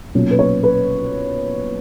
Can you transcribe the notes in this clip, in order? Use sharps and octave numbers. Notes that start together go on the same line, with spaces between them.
B1 A#2 F#3 C#4
B4
C#5
B4